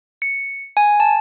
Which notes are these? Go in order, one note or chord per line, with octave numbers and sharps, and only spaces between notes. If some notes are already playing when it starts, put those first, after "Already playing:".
C#7
G#5
A5